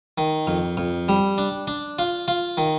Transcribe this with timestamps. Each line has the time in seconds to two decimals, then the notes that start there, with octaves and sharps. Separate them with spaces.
0.18 D#3
0.47 F2
0.77 F2
1.08 G3
1.38 D4
1.67 D4
1.99 F4
2.28 F4
2.57 D#3